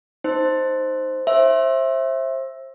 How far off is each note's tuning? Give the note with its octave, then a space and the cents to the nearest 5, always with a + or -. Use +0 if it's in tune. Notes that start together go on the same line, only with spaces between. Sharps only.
D#4 +0 C5 +0
C5 +30 E5 +0